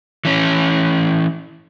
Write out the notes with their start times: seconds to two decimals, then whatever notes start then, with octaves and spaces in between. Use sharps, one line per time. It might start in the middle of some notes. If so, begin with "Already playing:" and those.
0.25 E3 C#4